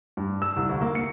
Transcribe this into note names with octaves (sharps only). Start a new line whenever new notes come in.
G2
E6
C2
D2
A#3
C#7